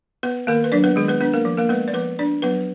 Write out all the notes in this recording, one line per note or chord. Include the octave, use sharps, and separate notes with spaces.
B3 B4
D#3 A#3 A#4
B4
F#3 D4 D5
B3 B4
D#3 G#3 G#4
B3 B4
B3 D4 B4
A#3 A#4
F3
A#3 A#4
G#3 B3 B4
D5
F3 B3 B4
D4 D5
F#3 B3 B4